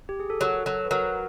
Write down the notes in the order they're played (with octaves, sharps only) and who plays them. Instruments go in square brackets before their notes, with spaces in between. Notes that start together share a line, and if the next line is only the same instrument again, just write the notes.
[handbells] G4
G#4
A4
[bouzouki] F#3 [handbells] A#4
[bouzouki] F#3 [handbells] A4
[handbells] B4
[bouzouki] F#3 [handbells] A#4